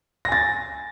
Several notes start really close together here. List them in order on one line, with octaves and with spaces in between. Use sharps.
A#6 G#5 A6